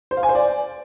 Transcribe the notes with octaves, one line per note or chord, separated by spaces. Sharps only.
C5
F5
G#5
C5
D5